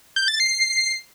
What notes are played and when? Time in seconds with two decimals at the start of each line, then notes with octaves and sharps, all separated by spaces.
0.16 G6
0.28 A6
0.40 C7